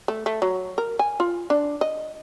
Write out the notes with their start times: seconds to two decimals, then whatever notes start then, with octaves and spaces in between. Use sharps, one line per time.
0.08 A3
0.26 A3
0.42 F#3
0.78 A#4
0.99 G#5
1.20 F4
1.50 D4
1.81 D#5